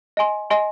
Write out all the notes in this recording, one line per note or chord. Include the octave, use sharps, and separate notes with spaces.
D#5 G#5 C6
D#5 G#5 C6